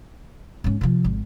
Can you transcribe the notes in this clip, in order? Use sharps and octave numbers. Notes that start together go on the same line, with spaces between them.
G#2 C#4
C3 F3
G#1